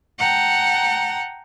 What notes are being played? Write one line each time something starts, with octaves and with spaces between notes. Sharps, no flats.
F#5 G5 A5 A#5